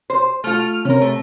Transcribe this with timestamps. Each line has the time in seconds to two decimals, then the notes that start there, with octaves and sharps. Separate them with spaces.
0.10 C5
0.44 A3 F4 F6
0.85 C3 C#4 A#4
1.01 A3